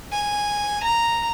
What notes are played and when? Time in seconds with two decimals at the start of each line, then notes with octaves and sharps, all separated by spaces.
0.12 G#5
0.84 A#5